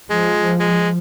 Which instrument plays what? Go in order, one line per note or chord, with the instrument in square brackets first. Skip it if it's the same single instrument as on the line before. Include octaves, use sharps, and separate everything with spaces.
[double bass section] F3 [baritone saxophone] G#3
[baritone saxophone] G#3